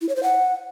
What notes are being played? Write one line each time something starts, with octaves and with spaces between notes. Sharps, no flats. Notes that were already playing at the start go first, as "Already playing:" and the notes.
E4
C#5
C5
F#5